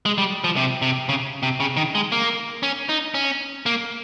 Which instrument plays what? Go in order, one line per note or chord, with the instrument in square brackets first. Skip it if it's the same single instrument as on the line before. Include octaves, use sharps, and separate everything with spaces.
[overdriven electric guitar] G#3
G3
F3
C3
C3
C#3
C3
C#3
D#3
G#3
A#3
C#4
D#4
C#4
A#3